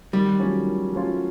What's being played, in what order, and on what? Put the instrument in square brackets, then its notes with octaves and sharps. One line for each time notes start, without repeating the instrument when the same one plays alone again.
[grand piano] D#3 [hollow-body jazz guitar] G3
[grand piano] F#3 A3 C#4 F4
D#3
F#3 A3 C#4 F4